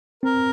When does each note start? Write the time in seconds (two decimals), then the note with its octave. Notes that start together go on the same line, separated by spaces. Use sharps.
0.23 C4 A#4